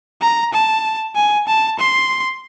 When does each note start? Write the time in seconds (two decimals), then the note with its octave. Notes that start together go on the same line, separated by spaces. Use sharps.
0.21 A#5
0.53 A5
1.15 G#5
1.47 A5
1.79 C6